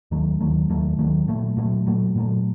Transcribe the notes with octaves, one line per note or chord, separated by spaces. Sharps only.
D#2 D#3 F#3 A3
D#2 D#3 F#3 A3
D#2 D#3 F#3 A3
D#2 D#3 F#3 A3
A#2 F#3 A3
A#2 F#3 A3
A#2 F#3 A3
A#2 F#3 A3